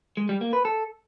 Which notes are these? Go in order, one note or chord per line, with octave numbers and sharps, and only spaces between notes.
G#3
G3
A#3
B4
A4